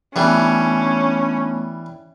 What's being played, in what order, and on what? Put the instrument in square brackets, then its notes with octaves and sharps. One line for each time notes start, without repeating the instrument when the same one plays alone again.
[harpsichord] E3 G3 [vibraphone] A3 B3 D4 [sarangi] C#4